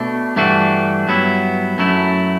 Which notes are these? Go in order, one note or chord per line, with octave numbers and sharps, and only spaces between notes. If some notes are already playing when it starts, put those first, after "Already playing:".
Already playing: B2 A3 D4
G2 E3 A3 D4 F#4
G2 F#3 B3 E4
F#2 F#3 A3 E4